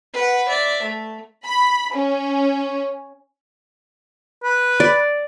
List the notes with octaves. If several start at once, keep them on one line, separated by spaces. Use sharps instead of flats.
B4 F#5
D5 E5
A3
B5
C#4
B4
D5